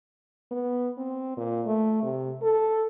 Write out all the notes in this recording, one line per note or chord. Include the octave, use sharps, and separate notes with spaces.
B3
C4
A#2
A3
C3
A4